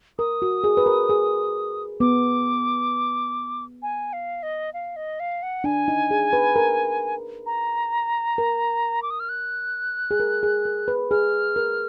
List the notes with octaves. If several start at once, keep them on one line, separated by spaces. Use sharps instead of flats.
A#4 D#6
F#4
G#4
B4
A#4
G#4
B3 D6
G#5
F5
D#5
F5
D#5
F5
F#5
D4 G#5
D#4
G#4
B4
A#4
A#5
A#4
D6
D#6
F6
F#6
G#4
A#4
G#4
A#4
B4
G#4 F6
A#4